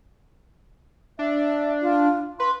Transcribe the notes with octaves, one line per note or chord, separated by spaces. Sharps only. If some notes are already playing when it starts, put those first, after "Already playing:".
D4 E5
F4
B4 C6